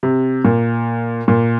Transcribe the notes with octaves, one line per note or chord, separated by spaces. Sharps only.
C3
A#2
A#2